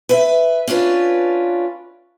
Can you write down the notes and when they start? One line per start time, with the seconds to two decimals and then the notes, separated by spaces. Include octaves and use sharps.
0.09 B4 E5
0.67 C#4 D4 F4 B4